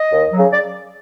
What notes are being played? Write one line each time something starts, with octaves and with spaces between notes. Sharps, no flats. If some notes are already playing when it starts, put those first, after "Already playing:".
Already playing: D#5
D#2
C#3 F#3
D5